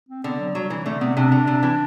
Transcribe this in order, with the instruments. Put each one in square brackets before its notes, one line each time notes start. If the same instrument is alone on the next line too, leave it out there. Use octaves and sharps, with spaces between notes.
[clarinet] C4
[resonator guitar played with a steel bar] D3 [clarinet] B3
[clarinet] F#3
[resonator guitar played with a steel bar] F#3 [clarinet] G3
[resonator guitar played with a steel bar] E3
[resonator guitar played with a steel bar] D3 [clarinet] A3
[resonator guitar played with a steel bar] C3 [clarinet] B3
[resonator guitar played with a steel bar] C3 [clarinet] D4
[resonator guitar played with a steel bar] D3
C3
E3